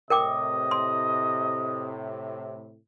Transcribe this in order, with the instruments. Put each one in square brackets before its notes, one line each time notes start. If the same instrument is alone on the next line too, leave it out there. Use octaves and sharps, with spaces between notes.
[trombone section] A2 C3 [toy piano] A#4 G5 D6 [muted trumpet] D#5
[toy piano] C6